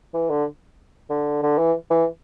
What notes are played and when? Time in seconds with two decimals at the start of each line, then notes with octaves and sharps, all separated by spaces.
0.14 E3
0.30 D3
1.10 D3
1.43 D3
1.58 E3
1.91 E3